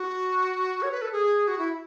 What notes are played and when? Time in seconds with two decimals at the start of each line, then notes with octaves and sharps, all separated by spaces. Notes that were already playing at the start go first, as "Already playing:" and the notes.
Already playing: F#4
0.82 C#5
0.92 B4
1.02 A4
1.12 G#4
1.48 F#4
1.58 E4